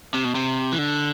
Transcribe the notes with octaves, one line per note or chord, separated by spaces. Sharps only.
C3
B2
C3
E3
D3